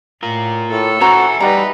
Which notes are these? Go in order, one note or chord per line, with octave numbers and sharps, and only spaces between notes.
A2 F4 A#4
A2 A4
C#4 F#4 C5 E5 G#5 A#5
G3 D#4 B4 D5 F#5 A#5